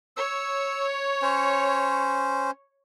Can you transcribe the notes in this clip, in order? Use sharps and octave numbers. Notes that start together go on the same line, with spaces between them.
C#5 E6
C#4 C5